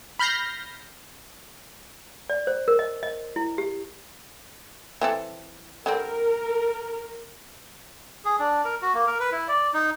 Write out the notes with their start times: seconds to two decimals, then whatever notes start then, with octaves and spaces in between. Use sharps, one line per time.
0.19 B5 F6 G6 A#6 C7
2.30 D5
2.47 C5
2.68 A#4
2.79 D#5
3.03 D#5
3.36 E4
3.58 G4
5.01 E3 C4 A4
5.86 D3 G3 C4 A#4
8.25 G#4
8.39 D4
8.65 A#4
8.82 F#4
8.94 A#3
9.07 A#4
9.20 B4
9.32 E4
9.48 D5
9.74 D#4